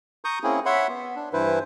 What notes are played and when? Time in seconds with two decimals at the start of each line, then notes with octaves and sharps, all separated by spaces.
0.25 A#5 C#6 D#6 G6
0.44 A#3 C4 C#4 E4 G#4
0.66 C#5 E5 F#5 B5 C6
0.88 B3
1.16 D4
1.33 G2 E3 E4 B4 C5